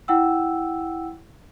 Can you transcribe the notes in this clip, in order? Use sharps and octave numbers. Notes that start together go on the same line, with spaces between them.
E4 F#5 G5 E6